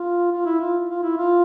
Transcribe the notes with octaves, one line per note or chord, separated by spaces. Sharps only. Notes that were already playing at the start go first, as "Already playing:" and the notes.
Already playing: F4
F4
E4
F4
F4
E4
F4